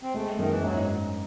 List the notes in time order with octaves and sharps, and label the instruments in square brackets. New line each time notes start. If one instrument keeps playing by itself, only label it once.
[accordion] C4
[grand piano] G#3 [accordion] A3
[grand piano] F#2 [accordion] D#3
[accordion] E3
[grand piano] G#2 [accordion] F#3